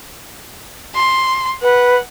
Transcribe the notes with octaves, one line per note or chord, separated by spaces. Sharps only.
C6
B4 F#5